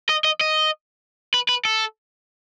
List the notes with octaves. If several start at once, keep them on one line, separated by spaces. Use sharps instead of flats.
D#5
D#5
D#5
B4
B4
A4